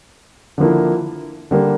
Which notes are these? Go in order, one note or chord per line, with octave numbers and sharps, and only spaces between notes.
D3 F3 A#3 E4
D3 G3 A#3